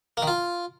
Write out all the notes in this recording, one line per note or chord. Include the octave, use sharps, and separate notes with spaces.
A#3
D#3
F4